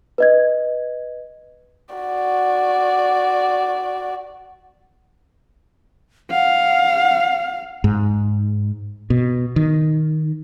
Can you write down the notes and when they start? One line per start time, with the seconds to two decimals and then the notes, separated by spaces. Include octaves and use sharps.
0.18 B4 D#5 G#6
1.95 F#4 D5
6.31 F5 F#5
7.84 G#2
9.10 B2
9.56 D#3